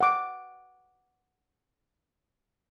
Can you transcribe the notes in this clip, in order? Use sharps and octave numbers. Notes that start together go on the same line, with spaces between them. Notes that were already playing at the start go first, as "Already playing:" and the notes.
F#5 D6